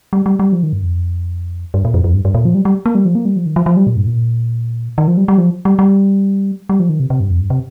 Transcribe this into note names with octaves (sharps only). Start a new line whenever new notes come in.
G3
G3
G3
F3
D#3
G2
F2
G2
A#2
F2
F2
G2
G2
A#2
F3
G3
G3
A#3
G3
F3
A#3
G3
F3
D#3
F3
F3
G3
A#2
G2
A#2
D#3
F3
G3
G3
F3
G3
G3
G3
F3
D#3
C3
C3
G2
F2
G2
C3